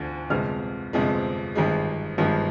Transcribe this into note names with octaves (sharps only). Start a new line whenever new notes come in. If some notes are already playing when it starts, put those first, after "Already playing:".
Already playing: D2 D3 F3
G1 F2 C3 F3 G#3 F6
G1 F2 C3 F3 G#3
G#1 G2 F3 G#3
G#1 G2 F3 G#3